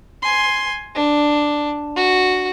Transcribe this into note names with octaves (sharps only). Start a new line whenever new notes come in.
G#5 C6
D4
F#4